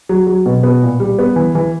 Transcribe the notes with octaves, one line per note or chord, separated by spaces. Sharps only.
F#3
F#3
B2
B3
A#2
G3
B3
E3
E3